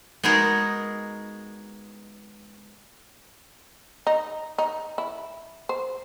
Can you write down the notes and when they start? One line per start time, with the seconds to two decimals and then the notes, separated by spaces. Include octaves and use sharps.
0.23 G#3 B3 D#4 F#4 G#4 A#4
4.07 D#4
4.58 D#4
4.98 E4
5.69 C5